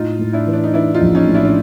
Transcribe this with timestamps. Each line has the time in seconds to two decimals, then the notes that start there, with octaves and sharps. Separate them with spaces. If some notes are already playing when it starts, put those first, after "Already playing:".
Already playing: A2 D#4 F4
0.19 A2
0.33 D4 E4
0.47 E3
0.53 D4
0.64 D#4
0.74 E3 D4 E4
0.94 D#4 F4
1.01 A#1
1.15 C#4 D#4
1.28 A2
1.34 D4 E4
1.45 D4